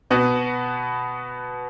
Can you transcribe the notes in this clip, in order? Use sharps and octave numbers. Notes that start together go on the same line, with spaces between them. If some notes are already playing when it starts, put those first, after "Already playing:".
B2 B3 F#4